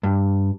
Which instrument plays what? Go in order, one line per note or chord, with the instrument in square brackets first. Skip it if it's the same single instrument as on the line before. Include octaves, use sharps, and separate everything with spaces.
[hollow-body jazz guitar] G2